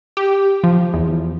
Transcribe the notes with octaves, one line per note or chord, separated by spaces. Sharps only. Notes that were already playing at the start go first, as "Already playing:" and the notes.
G4
F3
E2